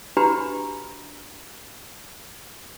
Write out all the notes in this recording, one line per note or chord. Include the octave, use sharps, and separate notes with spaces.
D4 F#4 G4 B4 A#5 B5